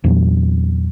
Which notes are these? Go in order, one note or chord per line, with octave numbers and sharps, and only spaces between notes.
E2 A#2 F#3